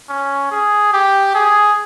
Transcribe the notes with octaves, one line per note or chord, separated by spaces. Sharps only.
C#4
G#4
G4
G#4